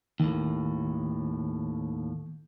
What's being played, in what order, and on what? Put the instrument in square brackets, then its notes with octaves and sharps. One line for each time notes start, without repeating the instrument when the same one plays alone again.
[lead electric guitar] D#2 A2 [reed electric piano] D#3